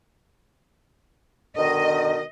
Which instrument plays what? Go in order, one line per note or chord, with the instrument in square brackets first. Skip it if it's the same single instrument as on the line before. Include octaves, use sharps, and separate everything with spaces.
[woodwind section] B2 D3 D#3 [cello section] D#5